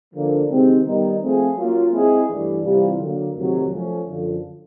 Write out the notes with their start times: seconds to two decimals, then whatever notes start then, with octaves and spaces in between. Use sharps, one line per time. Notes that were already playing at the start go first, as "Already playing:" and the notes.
0.14 D3 F3 A#3
0.50 C3 D#3 G#3 C4
0.85 D#3 G3 B3 D#4
1.21 F3 A3 C4 F4 G#4
1.57 F#3 A#3 C#4 F4
1.92 G#3 C4 E4 G#4
2.28 G2 E3 A3 D4
2.64 C3 E3 G3 C4 F4
2.99 D3 F#3 A#3
3.35 F2 C3 D#3 F#3 A3
3.71 F3 A3 C#4
4.07 F#2 D3 F3